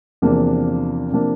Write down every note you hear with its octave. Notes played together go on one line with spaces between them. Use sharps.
E2 C3 F3 A#3 D4
C3 F3 A#3 D4